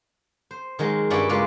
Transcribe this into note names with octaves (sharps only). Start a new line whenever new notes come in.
C5
D#3 F#3 G#3
G2 C#4 E4 B4 D5 F#5
C#3 G#3 A#3 F4 B4